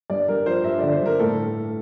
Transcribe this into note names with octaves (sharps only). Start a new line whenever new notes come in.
G2 D5
G2 A#4
F3 C5
G2 E5
D3 D5
C5
G2 A#4
A2 A4